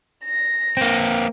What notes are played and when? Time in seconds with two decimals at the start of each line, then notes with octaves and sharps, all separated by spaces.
0.23 A#6
0.77 A#3 C4